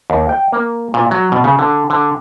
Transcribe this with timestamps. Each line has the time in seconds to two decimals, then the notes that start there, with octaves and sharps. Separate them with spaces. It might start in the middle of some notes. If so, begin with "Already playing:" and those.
0.10 D#2
0.29 G5
0.53 A#3
0.94 A#2
1.11 F#3
1.32 B2
1.44 C#3
1.59 D3
1.90 D3